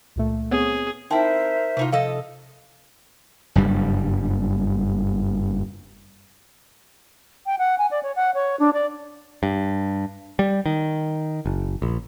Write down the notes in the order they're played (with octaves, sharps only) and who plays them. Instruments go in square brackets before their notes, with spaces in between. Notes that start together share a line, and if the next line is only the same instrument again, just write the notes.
[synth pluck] C#2 A#2 A3
[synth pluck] B3 C4 C#5 [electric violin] G#4
[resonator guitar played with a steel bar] C4 E4 [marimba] D#4 G5 A5 [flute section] A#4 C5 E5
[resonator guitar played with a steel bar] A2 D#4 F4 [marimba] C3
[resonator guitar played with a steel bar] F3 A4 D#5 [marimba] F5
[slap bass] F#1 G2 G3
[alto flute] G5
F#5
G#5
D5
C#5
F#5
C#5
D4
D5
[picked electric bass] G2
G3
D#3
F#1
A#1